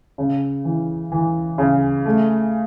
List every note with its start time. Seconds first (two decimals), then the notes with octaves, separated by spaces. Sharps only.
0.18 C#3
0.65 E3
1.12 E3
1.58 C#3
2.05 A3